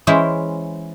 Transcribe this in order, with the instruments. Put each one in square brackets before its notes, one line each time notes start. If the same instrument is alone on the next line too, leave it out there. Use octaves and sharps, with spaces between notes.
[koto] E3 G#3 C#4 E4 C5